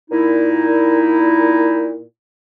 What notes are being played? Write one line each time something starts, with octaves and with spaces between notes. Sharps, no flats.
A#2 D#4 E4